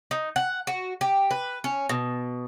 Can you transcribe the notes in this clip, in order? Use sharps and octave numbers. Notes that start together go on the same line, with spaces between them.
D#4
F#5
F#4
G4
B4
C#4
B2